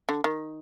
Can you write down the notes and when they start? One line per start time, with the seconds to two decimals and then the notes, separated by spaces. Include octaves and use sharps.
0.09 D3
0.24 D#3